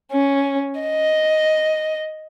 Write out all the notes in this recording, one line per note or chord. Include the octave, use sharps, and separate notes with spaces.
C#4
D#5